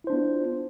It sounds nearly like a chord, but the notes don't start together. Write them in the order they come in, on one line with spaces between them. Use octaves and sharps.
E4 C5 D4 B3 F4